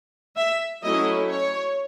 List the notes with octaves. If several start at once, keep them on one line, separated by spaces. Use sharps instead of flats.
E5
F#3 A3 C#4 E4 D#5
C#5